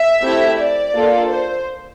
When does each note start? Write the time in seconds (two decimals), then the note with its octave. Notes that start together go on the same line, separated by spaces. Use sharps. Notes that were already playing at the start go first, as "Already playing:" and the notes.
Already playing: E5
0.22 A3 C4 E4 G4
0.59 D5
0.95 A#3 D4 F4 A4
1.30 C5